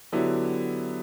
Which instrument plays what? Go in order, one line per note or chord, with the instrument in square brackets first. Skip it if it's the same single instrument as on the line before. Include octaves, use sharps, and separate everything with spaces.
[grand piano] D3 F#3 B3 E4 G4